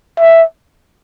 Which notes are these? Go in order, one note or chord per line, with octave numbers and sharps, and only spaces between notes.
E5